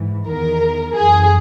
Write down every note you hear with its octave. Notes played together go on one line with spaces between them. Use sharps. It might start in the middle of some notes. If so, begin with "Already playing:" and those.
Already playing: G#2 E3
E2 D#3 A#4
F#2 E3 G#4